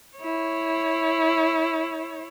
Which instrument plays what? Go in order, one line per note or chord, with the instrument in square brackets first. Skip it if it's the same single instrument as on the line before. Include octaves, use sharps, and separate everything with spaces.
[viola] E4 C#5